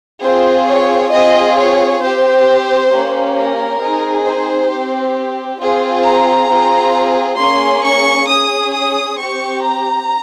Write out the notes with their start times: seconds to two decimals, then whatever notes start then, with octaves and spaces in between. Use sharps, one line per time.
0.22 C4 F4 G#4 C5
0.67 C#5
1.11 C4 F4 G#4 D#5
1.57 C#5
2.01 C4 G4 C5
2.91 A#3 C#4 G4
3.36 A#4
3.80 C4 D#4 G#4
4.24 C5
4.70 C4 G4
5.59 C4 F4 G#4
6.04 A#5
6.49 C4 F4 G#4
7.38 A#3 C#4 G#4 C6
7.83 C#6
8.27 C#4 G#4 D#6
8.73 D#6
9.17 C4 G4 C#6
9.62 A#5